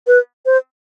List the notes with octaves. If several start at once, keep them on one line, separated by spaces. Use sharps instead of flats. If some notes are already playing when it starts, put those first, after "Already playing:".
B4
C5